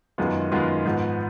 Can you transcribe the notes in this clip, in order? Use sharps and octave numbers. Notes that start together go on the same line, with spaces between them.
F#2 D#3 G#3 B3 F4
F#2 D#3 G#3 B3 F4
G#2 F3 B3